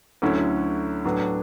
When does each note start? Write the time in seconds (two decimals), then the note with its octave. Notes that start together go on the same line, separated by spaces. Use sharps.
0.22 D2 D3 F#3 C#4 E4
1.05 A2 F#3 B3 D4